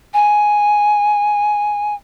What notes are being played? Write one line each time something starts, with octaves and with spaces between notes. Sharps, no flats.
G#5